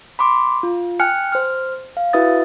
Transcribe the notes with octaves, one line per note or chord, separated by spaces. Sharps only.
B5 C6 D6
F4
G5 G#5 F6 F#6 C#7
C5 F6
F5
E4 F#4 B4 E5 D#6 A6